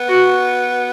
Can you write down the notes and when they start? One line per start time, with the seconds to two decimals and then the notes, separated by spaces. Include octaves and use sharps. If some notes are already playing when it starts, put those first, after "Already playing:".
Already playing: B3
0.08 F#4